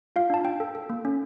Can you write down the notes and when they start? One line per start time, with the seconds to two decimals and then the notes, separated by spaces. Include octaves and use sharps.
0.16 F4 F5
0.30 D4 A5
0.45 D4 G5
0.60 A4
0.75 A4
0.90 A#3
1.05 C#4